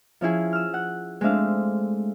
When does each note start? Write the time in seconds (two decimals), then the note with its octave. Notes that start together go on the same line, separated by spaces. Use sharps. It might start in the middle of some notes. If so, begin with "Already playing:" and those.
0.21 F3 C#4 E4 G#4
0.53 E6 F6
0.74 F#5
1.21 G#3 A3 C4 D4 E5 F5